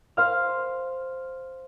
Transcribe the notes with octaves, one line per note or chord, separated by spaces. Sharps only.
C5 F5 F6